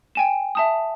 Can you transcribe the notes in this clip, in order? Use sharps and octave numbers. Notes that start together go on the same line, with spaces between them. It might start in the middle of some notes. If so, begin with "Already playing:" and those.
G5 G#5 E7
E5 A5 D#6